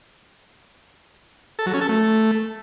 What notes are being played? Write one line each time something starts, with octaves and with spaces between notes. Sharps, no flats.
A4
F#3
C#4
A4
A3